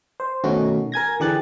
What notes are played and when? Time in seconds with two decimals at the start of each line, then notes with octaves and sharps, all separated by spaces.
0.20 C5
0.44 B2 D#3 A3 C#4 D#4 F#4
0.92 A#4 G#5 G#6 A#6
1.20 D3 E3 G4 G#4 F#6 A6